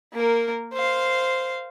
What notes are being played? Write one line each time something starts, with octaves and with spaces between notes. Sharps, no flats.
A#3 A#4
C5 F5